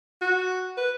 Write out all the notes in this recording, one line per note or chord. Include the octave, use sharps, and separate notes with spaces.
F#4
B4